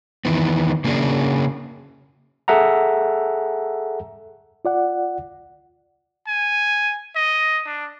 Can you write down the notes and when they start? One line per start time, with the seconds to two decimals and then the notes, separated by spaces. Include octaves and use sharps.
0.25 E2 D#3 E3 B3
0.84 C#3 A#3 C#4 D4 G#4 A#4
2.48 G#4 A4 E5 F#5 A#5
4.65 F4 D5 F#5
6.28 G#5
7.16 D#5
7.66 D4